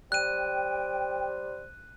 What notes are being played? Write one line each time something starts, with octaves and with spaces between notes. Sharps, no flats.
G3 C5 G5 F#6 D#7